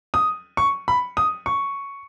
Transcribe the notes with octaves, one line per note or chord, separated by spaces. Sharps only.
D#6
C#6
B5
D#6
C#6